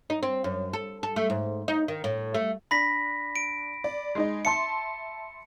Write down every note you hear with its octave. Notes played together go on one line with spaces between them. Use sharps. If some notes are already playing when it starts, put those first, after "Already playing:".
D#4
C4
F#2
A4
A4
A3
G#2
D#4
D#3
A2
A3
D4 B5 A#6 B6
D7
D5
G#3 D#4 D#5
E5 A5 C6 C#7